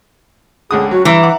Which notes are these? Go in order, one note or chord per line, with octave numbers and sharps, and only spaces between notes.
C#2 D3 G#4 D#6
F#3 C#4 F#4
G2 E3 E4 A#5
F#5 D6